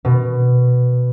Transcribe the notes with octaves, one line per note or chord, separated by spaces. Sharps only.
B2